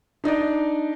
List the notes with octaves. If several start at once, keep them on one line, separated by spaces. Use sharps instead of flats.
D4 D#4 D5 D#5